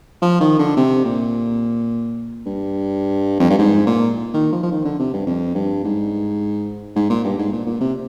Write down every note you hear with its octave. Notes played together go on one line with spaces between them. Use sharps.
F3
D#3
D3
C3
A#2
G2
F2
G2
G#2
A#2
D#3
F3
F3
D#3
D3
C3
G2
F2
G2
G#2
G#2
A#2
G2
G#2
A#2
A#2
C3